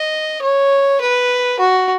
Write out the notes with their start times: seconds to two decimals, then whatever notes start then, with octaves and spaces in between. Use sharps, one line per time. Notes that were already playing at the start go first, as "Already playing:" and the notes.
Already playing: D#5
0.42 C#5
1.01 B4
1.59 F#4